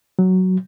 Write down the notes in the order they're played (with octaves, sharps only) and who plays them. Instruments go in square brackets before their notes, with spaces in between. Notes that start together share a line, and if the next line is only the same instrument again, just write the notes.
[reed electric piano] F#3